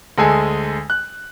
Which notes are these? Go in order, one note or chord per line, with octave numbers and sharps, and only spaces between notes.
D2 G#3 A4 G#5
F#6